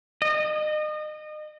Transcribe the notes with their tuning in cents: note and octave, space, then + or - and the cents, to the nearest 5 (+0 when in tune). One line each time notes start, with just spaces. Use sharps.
D#5 -30